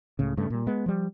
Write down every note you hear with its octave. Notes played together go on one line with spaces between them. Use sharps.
C#2 A2 C#3
G2 C#3 A3
A#2 G3
G#3 B3
F3 G3